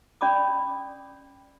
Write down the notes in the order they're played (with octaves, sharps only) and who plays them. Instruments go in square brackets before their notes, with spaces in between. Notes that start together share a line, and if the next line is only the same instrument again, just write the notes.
[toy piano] C#4 D5 B5 D6 D#6